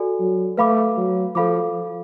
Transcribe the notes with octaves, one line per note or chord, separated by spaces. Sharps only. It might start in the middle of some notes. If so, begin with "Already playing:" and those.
Already playing: F#4 A4 D5 G#5
F#3
A3 B4 F5 B5 D6
F#3
F3 A4 F5 B5 D6